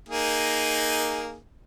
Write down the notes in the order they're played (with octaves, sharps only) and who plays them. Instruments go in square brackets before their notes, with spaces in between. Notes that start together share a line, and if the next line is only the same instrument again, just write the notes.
[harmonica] A#3 D#4 G#4